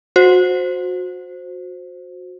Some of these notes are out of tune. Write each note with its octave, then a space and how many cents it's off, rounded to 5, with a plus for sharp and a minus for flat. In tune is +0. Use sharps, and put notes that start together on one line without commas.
F#4 -25 C5 +0